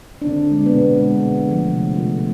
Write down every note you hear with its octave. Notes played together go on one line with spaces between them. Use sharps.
D4
D3 C4
G#3
B3
B2 C4
G#3
D3
F3 A3
C3
F3 A3
C3